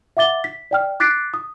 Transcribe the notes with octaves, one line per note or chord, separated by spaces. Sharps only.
E5 F#5 D6 A6 G7
B6
D5 G5 F6
D6 F#6 A6 B6 C7 D7
D#6